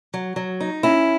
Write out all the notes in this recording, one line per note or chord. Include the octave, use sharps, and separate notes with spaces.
F#3
F#3
D#4
C#4 E4